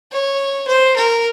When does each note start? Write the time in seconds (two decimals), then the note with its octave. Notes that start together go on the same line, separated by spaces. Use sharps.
0.12 C#5
0.67 C5
0.96 A#4